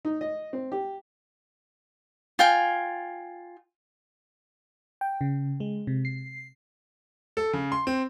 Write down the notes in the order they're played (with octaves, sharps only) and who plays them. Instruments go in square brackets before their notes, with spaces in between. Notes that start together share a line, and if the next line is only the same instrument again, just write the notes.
[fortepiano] D#4
D#5
C4
G4
[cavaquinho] F4 G5 G#5
[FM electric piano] G5
C#3
G#3
C3
C7
[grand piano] A4
C#3
C6
C4